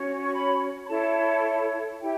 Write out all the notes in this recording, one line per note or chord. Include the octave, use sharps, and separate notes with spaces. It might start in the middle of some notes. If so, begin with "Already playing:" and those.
Already playing: C#4 F#4 C#5
C#6
B5
B5
E4 A4 C#5 A5
E4 G4 G5